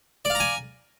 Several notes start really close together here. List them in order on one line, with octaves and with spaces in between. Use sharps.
D5 F5 A#5 G#5